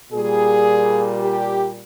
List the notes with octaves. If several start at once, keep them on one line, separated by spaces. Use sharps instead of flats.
A#2 G3 G#4
G4